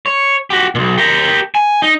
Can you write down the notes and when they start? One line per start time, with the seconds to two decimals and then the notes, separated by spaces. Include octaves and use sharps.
0.06 C#5
0.50 F#4 G4
0.75 B1 A#2
0.98 G4 A#4
1.55 G#5
1.82 D#4